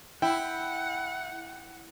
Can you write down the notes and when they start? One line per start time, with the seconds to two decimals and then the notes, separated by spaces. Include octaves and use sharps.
0.22 E4 F#5 G5